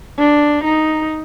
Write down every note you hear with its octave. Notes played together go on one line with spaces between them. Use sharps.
D4
D#4